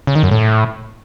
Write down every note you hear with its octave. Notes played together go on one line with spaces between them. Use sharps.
C#3
D#3
F#2
A2